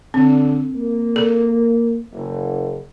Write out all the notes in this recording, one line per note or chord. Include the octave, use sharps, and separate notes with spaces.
D3 C4
A#3
A4
F#1